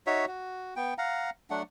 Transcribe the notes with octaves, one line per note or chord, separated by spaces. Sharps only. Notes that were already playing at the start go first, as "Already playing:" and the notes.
D#4 F#4 C#5 E5
F#4
B3 G5
F5 F#5 A#5
F#3 A3 D4 F#5